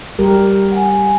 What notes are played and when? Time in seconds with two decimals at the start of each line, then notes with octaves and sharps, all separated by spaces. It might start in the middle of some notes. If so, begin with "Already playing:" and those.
0.19 G3 G4 A#4
0.72 F#5 G#5